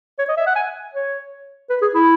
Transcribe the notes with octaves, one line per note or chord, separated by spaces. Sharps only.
C#5
D#5
E5
F#5
G#5
C#5
B4
G#4
E4